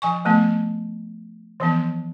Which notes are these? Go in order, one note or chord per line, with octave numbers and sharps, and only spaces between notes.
F3 G#5 C#6
F3 A3 B3
E3 F3 B3